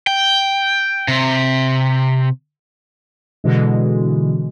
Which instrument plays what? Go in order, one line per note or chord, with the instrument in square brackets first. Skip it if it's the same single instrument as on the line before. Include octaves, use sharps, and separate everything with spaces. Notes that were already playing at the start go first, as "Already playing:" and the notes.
[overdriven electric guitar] G5
C3
[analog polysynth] B2 D3 E3 G#3